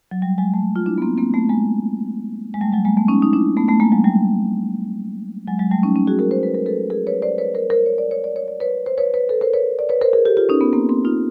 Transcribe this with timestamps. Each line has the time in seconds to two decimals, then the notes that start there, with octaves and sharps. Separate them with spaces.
0.11 F#3
0.22 G3
0.38 F#3 G#3
0.54 G3 A3
0.76 F4
0.86 D4 E4
0.98 B3
1.02 A#3 C4
1.18 A#3 C4
1.34 A3 B3
1.49 G#3 A#3
2.54 G#3
2.61 G3 A3
2.72 F#3 G#3
2.85 G#3 A#3
2.97 A3 B3
3.08 C#4 D#4
3.22 D#4
3.33 D4 E4
3.57 A3 B3
3.68 A3 B3
3.80 G#3 A#3
3.92 F#3 G#3
4.04 G3 A3
5.48 F#3 G#3
5.59 F#3 G#3
5.71 G3 A3
5.83 C#4 D#4
5.96 C#4 D#4
6.07 F#4 G#4
6.19 G#4 A#4
6.31 C5
6.43 B4
6.54 A#4
6.66 A4 B4
6.90 G#4 A#4
7.07 B4 C#5
7.22 C5 D5
7.38 B4 C#5
7.54 A#4 C5
7.70 A#4 C5
7.86 C#5
7.98 D5
8.11 C#5
8.24 D5
8.36 C#5
8.48 D5
8.60 B4 C#5
8.86 C5
8.98 B4 C#5
9.14 B4 C#5
9.29 A4 B4
9.41 A#4 C5
9.53 B4 C#5
9.79 D5
9.89 B4 C#5
10.01 A#4 C5
10.13 G#4 A#4
10.25 G4 A4
10.37 F4 G4
10.49 C#4 D#4
10.61 B3 C#4
10.73 A#3 C4
10.89 A#3 C4
11.05 D#4 F4